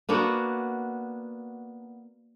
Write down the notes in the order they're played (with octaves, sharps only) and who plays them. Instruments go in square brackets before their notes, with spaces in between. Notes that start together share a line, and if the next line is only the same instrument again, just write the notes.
[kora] A#3 B3 D4 F#4